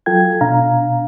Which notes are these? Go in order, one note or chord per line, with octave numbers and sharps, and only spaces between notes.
F#3 F4 A4 G5 G#6
B2 D4 F5 A#5